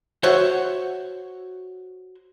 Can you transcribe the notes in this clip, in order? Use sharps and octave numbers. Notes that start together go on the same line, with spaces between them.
F#4 C5 C#5 E5 F#5